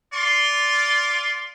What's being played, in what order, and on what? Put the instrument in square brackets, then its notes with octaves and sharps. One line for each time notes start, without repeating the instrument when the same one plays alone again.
[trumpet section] F4 D5 C6